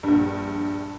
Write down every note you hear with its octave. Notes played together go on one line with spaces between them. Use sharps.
A#1 G2